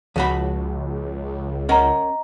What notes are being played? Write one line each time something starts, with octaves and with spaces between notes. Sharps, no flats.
C#2 F3 F#4 B5
C#4 A#4 D#5 F#5 A#5